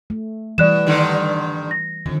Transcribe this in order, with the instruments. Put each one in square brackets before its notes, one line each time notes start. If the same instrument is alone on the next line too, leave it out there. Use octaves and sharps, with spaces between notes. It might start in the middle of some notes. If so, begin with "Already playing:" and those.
[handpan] A3
[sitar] B2 [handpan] E3 G3 [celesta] D5 F#6 E7
[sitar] G2 D3 D#3
[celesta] A#6
[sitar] F2 [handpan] D3 D#3